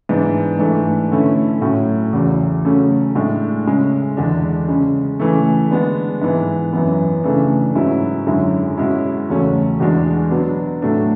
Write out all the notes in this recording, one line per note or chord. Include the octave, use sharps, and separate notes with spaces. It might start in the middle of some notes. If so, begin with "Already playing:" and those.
G#2 E3 B3 D4
G#2 E3 A3 D4
D3 A3 C#4 E4
A2 F#3 C#4
E2 C#3 F#3
C#3 F#3 A3 C#4
A2 G#3 D4
C#3 G#3 C#4
E2 D3 G#3 D4
C#3 G#3 C#4
C#3 E3 A3
D3 G#3 B3 D4
G#2 E3 B3
F#2 E3 B3
C#3 E3 A3 D4
G#2 F#3 C#4 E4
F#2 D3 G#3 C#4 E4
B2 G#3 C#4 E4
E2 C#3 F#3 A3 C#4
E2 B2 G#3 D4
B2 F#3 B3 D4
A2 F#3 A3 D4